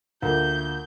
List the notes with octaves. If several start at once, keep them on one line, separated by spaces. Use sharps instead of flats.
D2 A#3 F4 A#4 G6